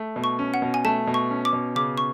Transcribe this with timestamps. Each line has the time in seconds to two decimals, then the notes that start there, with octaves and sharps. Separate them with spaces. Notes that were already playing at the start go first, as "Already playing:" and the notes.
Already playing: A3
0.16 B2
0.24 C#6
0.39 C#4
0.54 F#5
0.62 B2
0.74 G#5
0.84 A3 A5
1.07 B2
1.14 C#6
1.30 C#4
1.45 D6
1.53 B2
1.76 C#3 D6
1.98 C#6